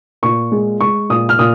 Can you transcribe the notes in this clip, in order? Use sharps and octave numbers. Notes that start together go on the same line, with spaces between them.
A#2 C#6
G#3
G#3 C#6
A#2 D#6
F6
A#2 D#6